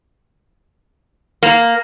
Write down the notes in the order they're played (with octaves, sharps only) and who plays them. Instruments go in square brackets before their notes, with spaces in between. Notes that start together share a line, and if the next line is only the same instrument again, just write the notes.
[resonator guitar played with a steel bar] A#3